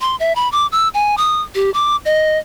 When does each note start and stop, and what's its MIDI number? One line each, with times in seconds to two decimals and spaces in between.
0.01 0.16 84
0.20 0.35 76
0.36 0.51 83
0.52 0.67 86
0.72 0.88 88
0.94 1.16 80
1.18 1.42 87
1.55 1.70 67
1.74 1.96 86
2.05 2.38 75